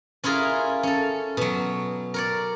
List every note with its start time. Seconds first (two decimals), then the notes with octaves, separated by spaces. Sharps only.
0.24 C#4 E4 F4 G#4 A#4
0.83 C#4 A4
1.37 B2 F#3
2.14 A#4 C#5 D5